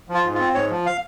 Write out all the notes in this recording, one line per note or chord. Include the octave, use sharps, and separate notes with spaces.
F3
F4
G#2
C4 F4
G#2 C#5
F3
F5